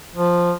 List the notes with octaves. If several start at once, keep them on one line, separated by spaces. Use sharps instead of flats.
F3